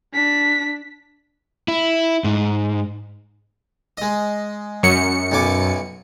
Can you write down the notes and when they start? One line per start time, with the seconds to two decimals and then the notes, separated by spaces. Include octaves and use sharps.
0.13 D4 B6
1.68 E4
2.24 G#2
3.98 G#3 D#5
4.83 F#2 C#7
5.32 B1 G#5 D6